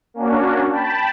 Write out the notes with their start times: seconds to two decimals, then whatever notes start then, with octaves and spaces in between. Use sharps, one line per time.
0.14 A#3 C#4 D4 F#4
0.70 G5 A5 B5